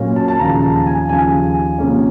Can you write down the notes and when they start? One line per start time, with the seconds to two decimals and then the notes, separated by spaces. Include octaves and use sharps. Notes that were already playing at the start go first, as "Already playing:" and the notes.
Already playing: A#2 F#3 A#3 C#4
0.16 A5
0.28 A5
0.39 D#2 C#3 F3 A#5
0.63 A5
0.86 G#5
1.09 D#2 C#3 F3 G#5
1.78 C3 F3 A#3 C#4